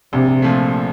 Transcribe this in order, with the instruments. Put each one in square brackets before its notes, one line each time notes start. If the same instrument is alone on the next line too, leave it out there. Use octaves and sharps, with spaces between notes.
[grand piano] A#1 [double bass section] C3
[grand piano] A#2 F3 A3